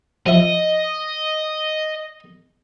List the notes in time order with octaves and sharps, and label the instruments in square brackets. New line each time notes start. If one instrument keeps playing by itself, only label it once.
[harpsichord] F3 E5 [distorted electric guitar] D#5